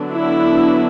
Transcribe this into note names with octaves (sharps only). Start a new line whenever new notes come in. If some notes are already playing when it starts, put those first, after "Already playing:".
Already playing: D3 F#3 B3 D4
E4